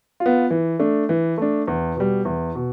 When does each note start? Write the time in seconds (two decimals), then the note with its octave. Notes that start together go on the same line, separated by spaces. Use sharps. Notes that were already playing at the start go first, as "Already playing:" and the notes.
0.20 F4
0.26 B3
0.50 E3
0.79 A3 D4
1.09 E3
1.38 A3 D4
1.68 E2
1.96 B2 G3
2.25 E2
2.55 B2